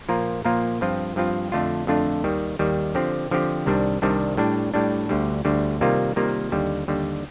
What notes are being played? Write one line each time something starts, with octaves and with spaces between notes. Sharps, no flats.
A#2 F3 A#3 F4 A#4
A#2 F3 A#3 F4 A#4
G2 F3 C4 F4
G2 F3 C4 F4
F2 D3 A3 D4 F4
F2 D3 A3 D4 F4
D#2 D#3 G3
D#2 D#3 G3
D3 F3 C4 G4
D3 F3 C4 G4
C2 C3 D#3 G3 D4
C2 C3 D#3 G3 D4
A2 G3 D4
A2 G3 D4
D2 D3 G3
D2 D3 G3
C3 D#3 G3 A#3 F4
C3 D#3 G3 A#3 F4
D#2 D3 G3
D#2 D3 G3